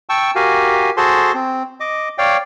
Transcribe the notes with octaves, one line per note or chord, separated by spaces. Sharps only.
G5 A5 C#6 E6
F#4 G4 A#4 F5 G#5
F#4 G#4 A4 C5 A5 C6
C4
D#5 D6
C#5 D5 F5 G5